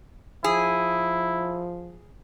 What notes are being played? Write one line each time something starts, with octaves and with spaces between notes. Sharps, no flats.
F3 E4 G#4